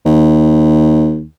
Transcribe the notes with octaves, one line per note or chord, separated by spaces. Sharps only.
D#2